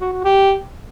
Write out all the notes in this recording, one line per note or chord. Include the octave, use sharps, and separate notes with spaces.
F#4
F#4
G4